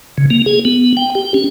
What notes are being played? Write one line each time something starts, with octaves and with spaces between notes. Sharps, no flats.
C#3
A#3
G#4
B3
G5
G4
C#4